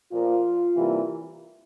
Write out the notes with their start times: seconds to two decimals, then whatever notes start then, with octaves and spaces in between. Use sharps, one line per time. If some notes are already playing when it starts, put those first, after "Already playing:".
0.12 A#2 F3 A#3 F4
0.76 C3 E3 G3 A#3